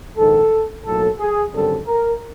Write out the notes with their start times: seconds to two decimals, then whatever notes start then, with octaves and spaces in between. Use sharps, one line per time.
0.17 A#1 G#2 D#3 A4
0.85 B1 A2 F#3 A#3 A4
1.20 G#4
1.53 G#1 F#2 D3 G3 C4 A4
1.87 A#4